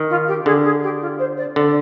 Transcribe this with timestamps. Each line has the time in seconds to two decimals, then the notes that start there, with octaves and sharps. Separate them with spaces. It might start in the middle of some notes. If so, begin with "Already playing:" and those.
Already playing: D#3
0.09 F4
0.27 G4
0.45 D3 G#4
0.64 G#4
0.82 G4
1.01 F4
1.19 C5
1.37 D5
1.56 D3 D5